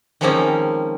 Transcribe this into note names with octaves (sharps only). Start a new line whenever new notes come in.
D#3 F3 G#3 A#3 C4 C#4